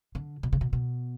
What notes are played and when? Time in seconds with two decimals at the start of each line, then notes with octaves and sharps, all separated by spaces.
0.15 D3
0.43 B2
0.53 C#3
0.61 B2
0.73 B2